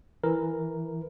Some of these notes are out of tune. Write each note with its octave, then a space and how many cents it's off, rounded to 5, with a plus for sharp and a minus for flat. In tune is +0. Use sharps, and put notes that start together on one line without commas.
E3 +0 A#4 +0